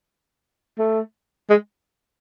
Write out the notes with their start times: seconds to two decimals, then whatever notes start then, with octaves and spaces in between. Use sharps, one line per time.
0.79 A3
1.50 G#3